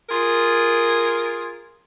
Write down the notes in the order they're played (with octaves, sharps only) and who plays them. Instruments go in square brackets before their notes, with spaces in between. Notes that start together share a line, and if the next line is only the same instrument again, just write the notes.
[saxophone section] F4 G#4 A#4